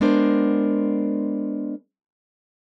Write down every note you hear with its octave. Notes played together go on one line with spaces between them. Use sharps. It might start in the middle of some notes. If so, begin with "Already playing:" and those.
G#3 B3 D4 A#4 C5